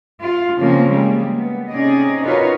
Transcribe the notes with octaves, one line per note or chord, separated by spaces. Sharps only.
F4
C#3 F3 A#3 C4
G3 G#3 A#3
B3
C3 C#4 D#4 G#4 D5 D#5
D#4 F4 F#4 A#4 B4 C#5